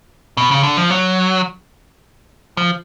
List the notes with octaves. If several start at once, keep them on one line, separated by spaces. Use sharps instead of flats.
B2
C#3
D3
F3
F#3
F3